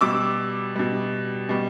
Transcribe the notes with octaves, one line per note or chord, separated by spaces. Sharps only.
B2 G3 D6 E6
B2 G3
B2 G3